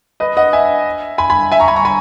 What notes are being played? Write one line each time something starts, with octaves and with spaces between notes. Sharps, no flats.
B4 D#5
D#5 F#5
E5 G#5
G#5 B5
G#5 B5
E5 G#5
A#5 C#6
G#5 B5
A#5 C#6
G#5 B5